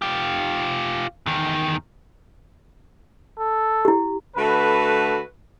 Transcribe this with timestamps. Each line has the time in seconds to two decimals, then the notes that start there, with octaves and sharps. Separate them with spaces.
0.02 F4 G4
1.26 E2 D#3
3.39 A4
3.85 E4 G4
4.36 D3 A3 F#4 B4